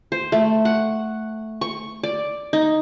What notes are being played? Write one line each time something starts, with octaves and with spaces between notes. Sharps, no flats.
C5
A3
F#5
C#6
D5
D#4